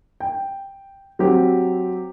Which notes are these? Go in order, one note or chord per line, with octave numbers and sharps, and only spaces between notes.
G5
F#3 C4 G4